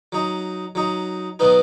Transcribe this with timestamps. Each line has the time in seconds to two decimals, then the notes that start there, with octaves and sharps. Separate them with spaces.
0.12 F#3 D#4
0.75 F#3 D#4
1.39 B2 F#3 B3 D#4